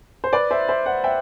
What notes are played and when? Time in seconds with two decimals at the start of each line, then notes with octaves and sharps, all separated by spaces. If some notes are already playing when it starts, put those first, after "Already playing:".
0.24 C5
0.33 B4 D5
0.51 C5 E5
0.68 C5 E5
0.86 D5 F#5
1.04 E5 G5